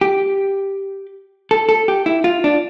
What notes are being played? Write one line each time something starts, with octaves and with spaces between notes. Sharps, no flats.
G4
A4
A4
G4
E4
F4
D4